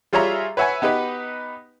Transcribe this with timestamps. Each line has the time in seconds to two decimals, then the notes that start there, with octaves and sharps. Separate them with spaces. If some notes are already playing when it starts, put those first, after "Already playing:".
0.13 G3 F4 G#4 C#5 E5 A#5
0.57 B4 C#5 E5 F#5 G#5
0.82 B3 D#4 G4 B4